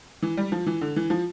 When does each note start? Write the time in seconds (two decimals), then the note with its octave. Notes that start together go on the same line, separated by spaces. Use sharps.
0.22 E3
0.37 G3
0.52 F3
0.66 E3
0.81 D3
0.96 E3
1.10 F3